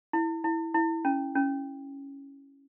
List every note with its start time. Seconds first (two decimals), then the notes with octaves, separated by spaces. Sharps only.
0.13 E4
0.44 E4
0.74 E4
1.05 C#4
1.35 C#4